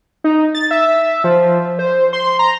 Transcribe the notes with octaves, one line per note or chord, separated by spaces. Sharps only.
D#4
A6
E5
F3
C5
C6
A#5